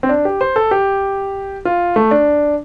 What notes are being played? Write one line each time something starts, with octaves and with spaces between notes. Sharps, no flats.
C4
D4
G4
C5
A4
G4
F4
A3
D4